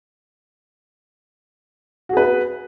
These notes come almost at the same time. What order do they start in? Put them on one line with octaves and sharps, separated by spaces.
F#4 G#4 B4 B3